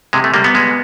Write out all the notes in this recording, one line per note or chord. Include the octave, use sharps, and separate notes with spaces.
C3 G#3
A3
G3 A#3
B3
G#3